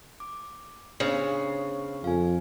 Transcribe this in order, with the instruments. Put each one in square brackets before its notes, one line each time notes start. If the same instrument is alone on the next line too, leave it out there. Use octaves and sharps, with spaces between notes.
[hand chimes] D6
[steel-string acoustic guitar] C#3 [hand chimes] B3 D4 C5
[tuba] F2 [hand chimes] F5 G#5